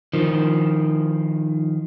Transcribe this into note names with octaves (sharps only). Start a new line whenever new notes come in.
D#3 F3